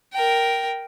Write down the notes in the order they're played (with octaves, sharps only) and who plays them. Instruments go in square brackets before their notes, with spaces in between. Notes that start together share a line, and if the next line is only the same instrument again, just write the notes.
[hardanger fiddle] A#4 G5